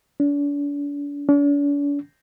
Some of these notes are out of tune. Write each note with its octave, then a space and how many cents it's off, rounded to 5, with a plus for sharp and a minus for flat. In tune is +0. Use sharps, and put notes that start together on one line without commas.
D4 -40
D4 -45